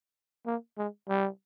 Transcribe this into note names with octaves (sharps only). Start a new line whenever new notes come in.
A#3
G#3
G3